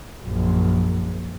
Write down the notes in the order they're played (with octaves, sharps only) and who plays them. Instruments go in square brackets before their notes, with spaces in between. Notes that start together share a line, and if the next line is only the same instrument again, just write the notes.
[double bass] A#1 F#2